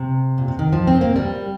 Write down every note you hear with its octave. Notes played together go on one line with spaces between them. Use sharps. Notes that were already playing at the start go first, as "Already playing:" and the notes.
Already playing: C3
A#2
C3
D#3
F3
C4
A#3
G3